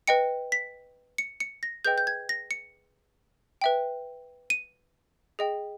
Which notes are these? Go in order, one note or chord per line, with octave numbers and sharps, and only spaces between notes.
B4 D#5 G5 C#7
B6
C#7
C#7
A#6
G#4 B4 D#5 G5 G6
G6
G#6
A#6
C#7
B4 E5 G5
D#7
G#4 D#5 G5